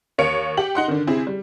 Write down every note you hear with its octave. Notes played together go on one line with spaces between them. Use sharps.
D#2 A#3 C#5 C#7 D7
G4 F#7
D#4 F#5 C6
D3 D#3
C3 C4 E4 G#4
G3